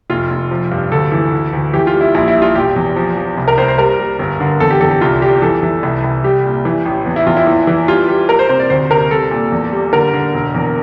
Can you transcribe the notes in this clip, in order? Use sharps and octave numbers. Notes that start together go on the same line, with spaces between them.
F1 F4
F1
F3
G2
D2 A4
E3
D2
D2
E3 G4
F4
G3
E4
A#1 E4
E4
G3
F4
E1 G4
E2
F3
F3
C2
A#4
C2 C5
C5
G3 A#4
G3
G1
D3
E2 A4
G4
E2 A4
G4
C2 F4
G3 G4
E3 A4
E3
C2
C2
G3 G4
A#2
E3
A1
E2
E4
E2 F4
E4
E3
E3
G3 F4
G3 G4
G3 A#4
C5
C3 C5
D5
D2 C5
C3 A#4
G3 A4
A#2
E2
G3
D3 A#4
D3
E1
E2